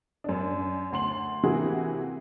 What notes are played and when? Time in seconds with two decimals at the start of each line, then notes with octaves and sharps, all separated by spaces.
0.24 F#2 D4
0.92 D2 C6 F#7
1.43 C3 E3 A#3 E4 F#4 G#4